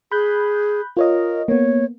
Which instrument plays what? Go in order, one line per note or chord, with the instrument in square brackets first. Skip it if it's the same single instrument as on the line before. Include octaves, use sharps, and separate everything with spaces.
[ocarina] G#4 [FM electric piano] B5 F#6 G6
[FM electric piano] F4 C#5 D#5 [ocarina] A#4
[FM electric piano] A#3 B3 [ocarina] C#5